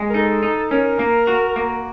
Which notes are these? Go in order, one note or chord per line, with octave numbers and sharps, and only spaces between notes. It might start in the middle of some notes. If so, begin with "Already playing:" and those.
Already playing: G#3
A#4
D#4 A4
D#4
C#4 A#4
A#3
F#4
A#3